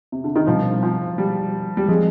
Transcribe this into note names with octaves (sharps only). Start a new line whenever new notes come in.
C3
D3
D#3
B2 F3 G3 C4
F3
G3
G3
F3 G#3 C4